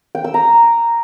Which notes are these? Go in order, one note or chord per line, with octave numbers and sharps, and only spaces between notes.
G5
E6
A#5